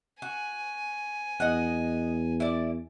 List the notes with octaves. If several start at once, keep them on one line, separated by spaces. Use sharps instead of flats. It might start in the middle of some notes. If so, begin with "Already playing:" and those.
F#4 G#5
E2 D#5 F#5
E4 D5